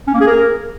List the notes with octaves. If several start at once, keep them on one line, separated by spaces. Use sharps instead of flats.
C#4
A#3
G#4
A#4